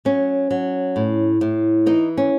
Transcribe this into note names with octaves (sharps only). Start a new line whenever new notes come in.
F#3 C#4
F#3
A2
A2
E3 D#4
C#4